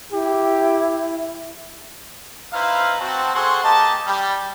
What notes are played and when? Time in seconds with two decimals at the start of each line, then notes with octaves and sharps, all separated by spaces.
0.13 E4 G4
2.53 D#4 E4 B4 C5 F5
2.99 C4 F#4 A5
3.34 G#4 A4 C5 F#5 C6 C#6
3.63 A#3 G4 D#5 A5
4.07 G3